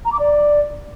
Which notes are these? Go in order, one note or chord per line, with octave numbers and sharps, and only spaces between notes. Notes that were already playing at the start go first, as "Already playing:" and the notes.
A#5
D6
D5